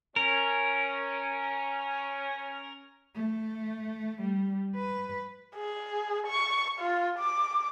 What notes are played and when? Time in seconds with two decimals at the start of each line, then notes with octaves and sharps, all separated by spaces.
0.16 C#4 A#4
3.16 A3
4.22 G3
4.75 B4
5.56 G#4
6.27 C#6
6.80 F4
7.19 D6